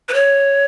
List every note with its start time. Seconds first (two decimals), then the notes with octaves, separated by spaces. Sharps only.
0.09 B4
0.14 C#5